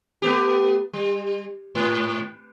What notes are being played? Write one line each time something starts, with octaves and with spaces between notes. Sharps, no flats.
A3 B3 G4
G3
G#2